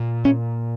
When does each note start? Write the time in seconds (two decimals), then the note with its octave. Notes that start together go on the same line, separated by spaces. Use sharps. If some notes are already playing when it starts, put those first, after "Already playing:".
Already playing: A#2
0.25 C#4